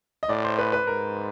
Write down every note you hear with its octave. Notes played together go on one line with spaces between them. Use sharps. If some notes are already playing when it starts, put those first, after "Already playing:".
D#5
A2 D5
C5
B4
B4
G#2 A#4